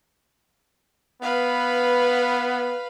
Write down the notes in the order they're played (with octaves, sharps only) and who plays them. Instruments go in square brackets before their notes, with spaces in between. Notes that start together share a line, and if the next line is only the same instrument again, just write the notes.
[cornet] B3 [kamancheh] B4 F5